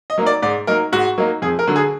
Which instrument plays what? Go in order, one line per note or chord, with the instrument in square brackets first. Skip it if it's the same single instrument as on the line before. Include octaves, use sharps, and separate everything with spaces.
[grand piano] D#5
F#3 A#3 D#4
D5
G#2 D5
F#3 A#3 D#4 A#4
G#2 F#4
F#3 A#3 D#4
F2 G#4
A#4
D3 F#3
G#4